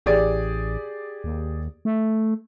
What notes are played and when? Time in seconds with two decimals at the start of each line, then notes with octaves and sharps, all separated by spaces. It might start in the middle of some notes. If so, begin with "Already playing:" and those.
0.06 A1 G4 G#4 D5
1.24 D#2
1.85 A3